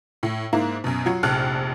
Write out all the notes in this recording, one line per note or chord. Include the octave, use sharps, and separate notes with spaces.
A2
G#2 A#3 E4
F#2 B2
F#3 F4 F#4
F1 A#1 A5 F6 F#6